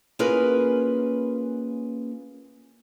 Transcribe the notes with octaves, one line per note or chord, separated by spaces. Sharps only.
A#3 C#4 F4 G#4 A#4 B4